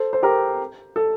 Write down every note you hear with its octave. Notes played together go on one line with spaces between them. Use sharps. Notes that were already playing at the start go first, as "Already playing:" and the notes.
Already playing: A4 C5
C5
G4 A#4
A4